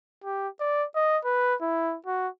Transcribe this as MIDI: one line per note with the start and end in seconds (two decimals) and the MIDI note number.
0.24 0.48 67
0.60 0.85 74
0.95 1.18 75
1.25 1.55 71
1.61 1.97 64
2.06 2.28 66